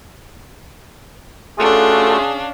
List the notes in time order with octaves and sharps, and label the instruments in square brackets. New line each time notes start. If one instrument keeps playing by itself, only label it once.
[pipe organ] A3 F4 F#4 [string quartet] C#4 D4 F5 [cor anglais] G#4 [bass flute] A4